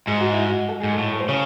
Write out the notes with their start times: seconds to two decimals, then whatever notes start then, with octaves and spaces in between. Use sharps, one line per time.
0.07 G#2 G#4
0.20 F#4
0.33 E4
0.47 F#4
0.69 A4
0.80 G#2 G#4
0.92 A4
0.98 A2
1.13 A4
1.20 C5
1.28 C#3 C#5